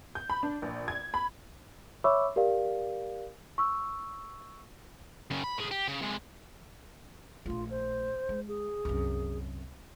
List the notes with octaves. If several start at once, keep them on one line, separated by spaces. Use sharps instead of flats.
G6
B5
D4
A#1
G#6
B5
C#5 E5 B5 C#6 D6 E6
G4 A#4 D5 F5
C#6 E6
F#2 C#3
B5
A2 G#4
G4
C#3
C3 G#3
A#1 A3 F4
C5
G#3
G#4
C2 F#2